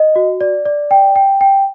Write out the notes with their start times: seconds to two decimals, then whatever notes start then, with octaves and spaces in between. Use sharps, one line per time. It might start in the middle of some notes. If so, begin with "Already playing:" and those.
Already playing: D#5
0.16 F#4
0.41 D5
0.66 D5
0.91 G5
1.16 G5
1.41 G5